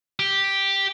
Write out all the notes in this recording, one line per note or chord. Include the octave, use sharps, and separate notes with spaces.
G4